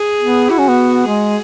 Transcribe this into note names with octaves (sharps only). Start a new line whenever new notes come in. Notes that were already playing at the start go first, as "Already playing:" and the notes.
Already playing: G#4
B3
E4 F#4
C#4
B3
G#3 G#4